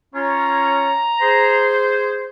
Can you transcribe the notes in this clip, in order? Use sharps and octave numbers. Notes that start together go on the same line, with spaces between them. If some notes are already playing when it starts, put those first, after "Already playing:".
C#4 F4 C#5 A#5
G#4 C5